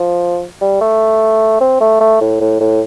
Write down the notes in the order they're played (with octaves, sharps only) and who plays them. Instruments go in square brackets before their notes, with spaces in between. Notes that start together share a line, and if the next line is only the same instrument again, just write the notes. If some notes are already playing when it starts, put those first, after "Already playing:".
Already playing: [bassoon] F3
G3
A3
C4
A3
A3
A2
A2
A2